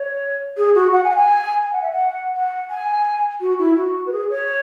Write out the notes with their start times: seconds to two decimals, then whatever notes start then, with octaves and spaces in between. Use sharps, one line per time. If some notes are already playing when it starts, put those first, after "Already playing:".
Already playing: C#5
0.57 G#4
0.75 F#4
0.92 F#5
1.04 G#5
1.10 F#5
1.16 G#5
1.63 G#5
1.73 F#5
1.82 E5
1.91 F#5
2.35 F#5
2.70 G#5
3.41 F#4
3.59 E4
3.76 F#4
4.06 B4
4.12 G#4
4.30 C#5